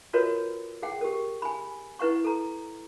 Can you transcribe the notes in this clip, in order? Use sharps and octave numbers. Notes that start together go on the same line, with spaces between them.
F4 F#4 A#4 B4 C#5 D#5
G#4 F#5 G5
G4 A#4
G#5 B5
E4 B4 F#5 C#6
A4 A#5